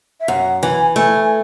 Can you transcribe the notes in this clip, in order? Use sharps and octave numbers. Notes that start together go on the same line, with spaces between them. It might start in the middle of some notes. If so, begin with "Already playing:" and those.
E5
F#2 F#5
E3 G#5
A3 G#5
G#5